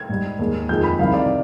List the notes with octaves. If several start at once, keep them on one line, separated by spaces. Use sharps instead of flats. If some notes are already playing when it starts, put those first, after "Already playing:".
Already playing: G#6
G#2 G3
D#2 D#3 G#3
F2 D#3 G#3 G6
B5
C2 C3 D#3 G3 F5
D5